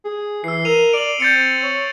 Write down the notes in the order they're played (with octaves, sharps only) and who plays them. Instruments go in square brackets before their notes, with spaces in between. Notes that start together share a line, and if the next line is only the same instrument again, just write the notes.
[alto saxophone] G#4
[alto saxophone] E3 [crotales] E6 C7
[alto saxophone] A#4 [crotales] D#7 F7
[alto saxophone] D5 [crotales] D7 F#7
[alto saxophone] C4 [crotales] G6 A6 C#7
[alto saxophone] C#5